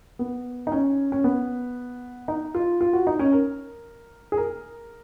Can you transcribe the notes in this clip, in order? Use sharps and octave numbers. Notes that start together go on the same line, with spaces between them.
B3
D#4
C#4
C#4
B3
D#4
F4
F4
F#4
D#4
C#4
A#4
G#4
A#4